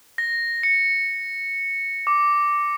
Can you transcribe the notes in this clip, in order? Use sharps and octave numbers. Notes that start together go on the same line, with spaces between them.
A#6
C#7
D6